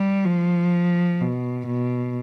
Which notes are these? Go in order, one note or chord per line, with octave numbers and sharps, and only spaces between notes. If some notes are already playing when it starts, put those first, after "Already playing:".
Already playing: G3
F3
B2
B2